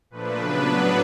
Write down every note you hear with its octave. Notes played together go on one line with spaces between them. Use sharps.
A#2 F3 A3 D4 B4
C#3 F#3 B3 D4
A2 F#3 B3 D4 B4